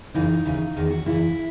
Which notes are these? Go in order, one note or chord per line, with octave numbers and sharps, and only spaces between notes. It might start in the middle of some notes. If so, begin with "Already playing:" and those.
F#2 C#3 E3 D#4
D#2 C#3 E3
E2 D#3
F#4
F#2 C#3 E3 E4